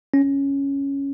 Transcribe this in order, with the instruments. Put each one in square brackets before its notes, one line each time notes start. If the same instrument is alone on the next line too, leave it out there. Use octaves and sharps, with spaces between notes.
[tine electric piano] C#4